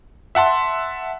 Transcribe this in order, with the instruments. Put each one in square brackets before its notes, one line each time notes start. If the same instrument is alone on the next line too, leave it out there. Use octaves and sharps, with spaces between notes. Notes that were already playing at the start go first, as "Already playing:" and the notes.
[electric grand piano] E5 F#5 A5 C6